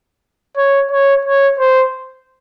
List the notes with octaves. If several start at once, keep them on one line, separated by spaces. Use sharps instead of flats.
C#5
C#5
C#5
C5